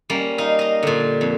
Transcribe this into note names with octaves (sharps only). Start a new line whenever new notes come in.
G3 A#3 C#4
D#4 F5
D#5 A#5
A#2 D3
F2